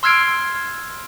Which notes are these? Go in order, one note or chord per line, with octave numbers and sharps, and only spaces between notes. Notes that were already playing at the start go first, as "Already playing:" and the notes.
C6 E6 F6 G#6 C7 D7